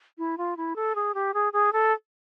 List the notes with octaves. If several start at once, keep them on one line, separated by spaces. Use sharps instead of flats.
E4
F4
E4
A4
G#4
G4
G#4
G#4
A4